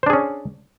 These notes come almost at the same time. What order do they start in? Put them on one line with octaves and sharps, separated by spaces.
C5 D4 G#4 C#4